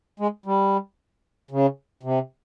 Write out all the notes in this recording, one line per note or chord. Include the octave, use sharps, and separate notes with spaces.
G#3
G3
C#3
C3